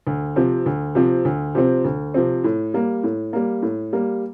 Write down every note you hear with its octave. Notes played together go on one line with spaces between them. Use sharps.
D2
C3 F3 C4
D2
C3 F3 C4
D2
C3 F3 C4
D2
C3 F3 C4
A2
G3 A#3
A2
G3 A#3
A2
G3 A#3